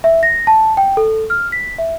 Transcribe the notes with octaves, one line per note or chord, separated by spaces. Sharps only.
E5
A#6
A5
G5
A4
F6
B6
E5